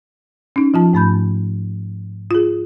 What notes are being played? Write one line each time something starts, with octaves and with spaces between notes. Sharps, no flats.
C#4 D#4
F3 F4 A5
G#2 A3 B5 G6
F4 G#4